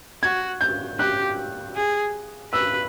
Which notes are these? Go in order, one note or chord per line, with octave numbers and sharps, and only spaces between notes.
F#4 G#6
G6
G4 F#6
G#4
B4 E6